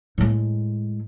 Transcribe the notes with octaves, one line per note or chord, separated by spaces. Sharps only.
A2 G#3